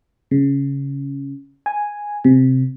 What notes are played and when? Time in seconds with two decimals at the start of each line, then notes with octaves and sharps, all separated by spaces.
0.31 C#3
1.66 G#5
2.24 C3